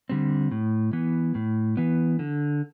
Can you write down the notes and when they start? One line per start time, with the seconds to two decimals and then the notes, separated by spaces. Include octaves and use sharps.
0.09 D3 G3 C4
0.52 A2
0.93 E3 B3
1.35 A2
1.77 E3 B3
2.19 D3